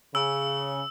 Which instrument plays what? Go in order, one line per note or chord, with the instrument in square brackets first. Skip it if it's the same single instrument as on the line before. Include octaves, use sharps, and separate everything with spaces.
[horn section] C#3 [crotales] E6